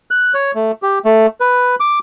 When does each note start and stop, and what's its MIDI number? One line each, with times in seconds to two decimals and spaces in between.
0.11 0.33 90
0.34 0.51 73
0.55 0.72 57
0.82 0.99 67
1.05 1.26 57
1.41 1.75 71
1.80 1.99 86